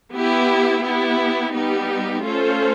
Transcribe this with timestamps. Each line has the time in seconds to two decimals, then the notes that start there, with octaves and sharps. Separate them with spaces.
0.12 B3 E4 G4
0.83 B3 E4 G4
1.53 G3 B3 D#4 G4
2.23 A3 C#4 F4 A4 C5